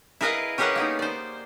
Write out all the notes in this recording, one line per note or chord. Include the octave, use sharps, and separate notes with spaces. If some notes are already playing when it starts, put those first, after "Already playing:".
E4 G#4 A#4 B4 D#5 F5
C#4 G4 G#4 A#4 B4 F#5
A#3 B3 D#4
C5 D5